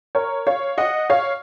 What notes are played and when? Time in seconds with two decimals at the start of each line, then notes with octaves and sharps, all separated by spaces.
0.15 A#4 C#5
0.47 C#5 F5
0.78 D#5 F#5
1.10 C#5 F5